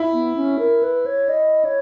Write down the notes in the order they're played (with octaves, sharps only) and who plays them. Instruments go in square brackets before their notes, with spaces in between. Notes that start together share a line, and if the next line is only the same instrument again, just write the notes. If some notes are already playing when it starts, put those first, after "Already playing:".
Already playing: [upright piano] E4
[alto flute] B3
C#4
A#4
B4
C#5
D#5
C#5